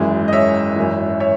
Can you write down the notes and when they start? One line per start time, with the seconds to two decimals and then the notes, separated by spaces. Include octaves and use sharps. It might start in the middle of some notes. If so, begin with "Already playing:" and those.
Already playing: G#1 F#2 E3 G#3
0.28 D#5
0.33 C#5 E5
0.76 G#1 F#2 E3
1.20 C#5 E5